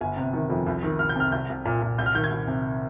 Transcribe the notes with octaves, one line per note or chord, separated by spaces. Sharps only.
G1 G#5
C3
D#3
F2
C2
D#3
C2 F6
G6
C3 F6
C2 G6
C2
A#2
A#2
C2 G6
F6
D#3 G6
G#6
C2
C3